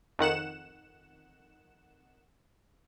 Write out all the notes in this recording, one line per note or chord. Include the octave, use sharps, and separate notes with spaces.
F2 D#3 F#5 E7